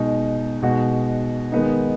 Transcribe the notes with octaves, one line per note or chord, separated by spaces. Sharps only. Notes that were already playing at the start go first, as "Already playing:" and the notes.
Already playing: B2 G#3 D#4
B2 G#3 D#4 F#4
D#3 G#3 B3 D#4